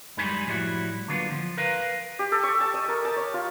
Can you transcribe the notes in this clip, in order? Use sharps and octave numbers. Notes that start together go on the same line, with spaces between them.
F#2 G3 G#3 D#4 G#5 B5
A2 F3 G3 E4 F#4
D3 F#3 A#3 B3 D4 F4
F3
A#4 B4 F5
G4
A4
C#6
A5
D#5
A#4
A5
C#5
F4